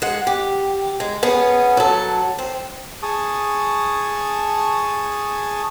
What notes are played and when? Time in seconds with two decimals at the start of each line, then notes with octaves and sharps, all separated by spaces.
0.02 G#3 F#5
0.27 G4
1.00 G#3
1.23 B3 C#4 G#4
1.77 F#3 A4
2.39 C4
3.03 G#4 A5 C#6 D#6